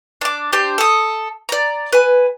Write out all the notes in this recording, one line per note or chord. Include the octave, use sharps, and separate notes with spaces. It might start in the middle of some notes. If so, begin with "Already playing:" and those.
D4 D6
D4 G4 C5 G6
A4 D#6
D5 A#5
B4 G#5